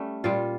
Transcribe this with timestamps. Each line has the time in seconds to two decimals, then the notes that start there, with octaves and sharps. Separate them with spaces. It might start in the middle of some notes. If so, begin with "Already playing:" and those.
Already playing: G3 A3 C#4
0.24 A#2 G3 F4